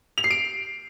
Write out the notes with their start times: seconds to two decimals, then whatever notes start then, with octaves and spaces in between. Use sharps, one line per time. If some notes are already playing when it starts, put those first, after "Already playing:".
0.18 F7
0.24 C7
0.31 D7